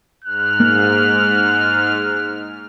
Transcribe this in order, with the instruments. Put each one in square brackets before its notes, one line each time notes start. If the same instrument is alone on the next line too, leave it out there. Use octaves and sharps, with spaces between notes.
[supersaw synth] G#2 F6 [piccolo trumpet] F#6
[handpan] A#3